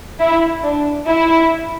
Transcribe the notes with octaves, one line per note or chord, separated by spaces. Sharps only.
E4
D4
E4